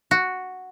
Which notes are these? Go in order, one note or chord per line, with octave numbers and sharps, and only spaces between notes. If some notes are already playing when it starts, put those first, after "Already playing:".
F#4